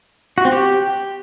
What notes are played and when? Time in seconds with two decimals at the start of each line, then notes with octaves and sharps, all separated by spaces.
0.38 F#4
0.45 C4
0.52 G4